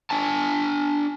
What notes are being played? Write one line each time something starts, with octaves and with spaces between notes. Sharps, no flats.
D4 G#5 A5